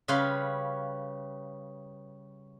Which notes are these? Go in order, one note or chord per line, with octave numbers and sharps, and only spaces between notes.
C#3 G3 B4 C#5 F5 C6